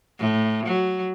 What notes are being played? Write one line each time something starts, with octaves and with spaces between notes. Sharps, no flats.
A2
F#3